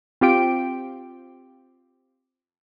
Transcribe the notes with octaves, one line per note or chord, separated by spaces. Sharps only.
C4 F4 G4 G5 D7